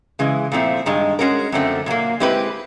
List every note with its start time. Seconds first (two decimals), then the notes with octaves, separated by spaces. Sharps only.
0.19 C#3 E3 G#3
0.52 A#2 F3 A3 C4 E4
0.86 G2 D#3 G#3
1.19 G#3 C#4 F#4 A#4
1.52 F#2 D3 F3 A3 C4
1.86 A#2 F#3 A#3
2.20 G#3 C4 E4 G4 B4